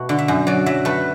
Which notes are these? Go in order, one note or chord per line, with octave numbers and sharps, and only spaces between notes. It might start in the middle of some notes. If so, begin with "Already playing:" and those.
Already playing: B2 A3 F#4
D3
E5
F#2
F#3 D5
F#3 E5
A3 B4